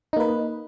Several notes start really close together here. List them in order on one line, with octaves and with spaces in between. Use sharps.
D#4 A#3 B4